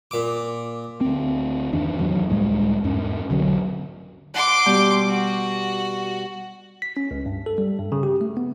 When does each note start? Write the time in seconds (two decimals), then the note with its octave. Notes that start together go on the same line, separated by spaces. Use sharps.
0.11 A#2 D6
1.01 D2 C4
1.72 G1 E2 D#3 D4
1.98 D1 E2 D#3 F#3
2.29 C#2 A2 G3 G#3
2.84 E2 G#2 C#4
3.29 B1 D3 E3 F#3
4.34 F#5 C6 D6
4.66 B2 G3 G4
5.07 F#4
6.82 B6
6.97 C#4
7.11 C#2
7.26 G2
7.46 A4
7.58 G3
7.79 G2
7.92 C#3
8.03 G4
8.21 A3
8.37 B3